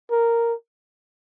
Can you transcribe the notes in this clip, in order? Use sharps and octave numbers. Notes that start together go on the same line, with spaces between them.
A#4